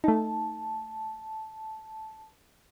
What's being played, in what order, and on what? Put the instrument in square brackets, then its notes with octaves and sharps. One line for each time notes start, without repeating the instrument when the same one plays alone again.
[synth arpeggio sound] A3 D#4 [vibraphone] A5